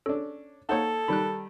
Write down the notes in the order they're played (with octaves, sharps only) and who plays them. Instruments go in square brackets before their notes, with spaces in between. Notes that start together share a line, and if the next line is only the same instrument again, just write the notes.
[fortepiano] C#4 D4 [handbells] A4
[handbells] A#3 C5 F#5 [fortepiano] D#4 C#5 [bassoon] A4
[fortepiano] D#3 G3 [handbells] B5 F#6